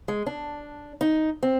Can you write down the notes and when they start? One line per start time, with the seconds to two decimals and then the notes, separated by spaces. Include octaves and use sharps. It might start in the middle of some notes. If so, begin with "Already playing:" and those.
0.08 G#3
0.26 D4
1.01 D#4
1.43 C4